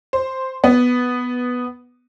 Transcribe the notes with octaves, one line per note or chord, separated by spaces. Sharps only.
C5
B3